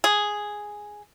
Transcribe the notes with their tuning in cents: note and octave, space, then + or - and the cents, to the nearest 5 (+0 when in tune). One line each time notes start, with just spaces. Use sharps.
G#4 +0